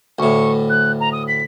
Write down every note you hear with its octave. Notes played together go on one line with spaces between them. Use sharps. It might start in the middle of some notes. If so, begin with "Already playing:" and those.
D2 A2 C#6
F#6
A#5
D#6
B6